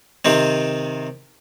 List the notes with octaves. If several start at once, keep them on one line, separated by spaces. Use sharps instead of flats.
C3 D#3 C4